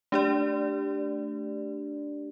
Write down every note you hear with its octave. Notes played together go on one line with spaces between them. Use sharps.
A3 D4 G4 D5